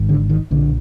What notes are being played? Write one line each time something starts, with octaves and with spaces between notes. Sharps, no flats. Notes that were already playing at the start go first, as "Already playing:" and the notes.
Already playing: G#1 G#2
D3
D#3
B1 A#2 D3